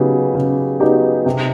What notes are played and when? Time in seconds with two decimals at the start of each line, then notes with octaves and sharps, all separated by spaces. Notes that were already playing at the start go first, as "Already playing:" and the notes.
Already playing: C#3 F#3 B3 D#4 G4
0.35 C#3
0.80 F#3 B3 D#4 G4
1.26 C3